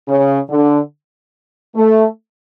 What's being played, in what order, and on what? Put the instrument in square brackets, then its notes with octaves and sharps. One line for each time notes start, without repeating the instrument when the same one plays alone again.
[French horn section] C#3
D3
A3